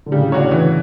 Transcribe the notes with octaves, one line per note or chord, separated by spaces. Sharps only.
D3
A2 C#3 G3
D4 F#4 C#5
E3